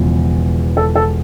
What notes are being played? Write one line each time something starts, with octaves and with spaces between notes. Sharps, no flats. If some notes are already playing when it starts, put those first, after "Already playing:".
Already playing: E1 E2 C#3 F3
A4
A4